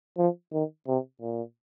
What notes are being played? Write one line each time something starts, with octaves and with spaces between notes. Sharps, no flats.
F3
D#3
C3
A#2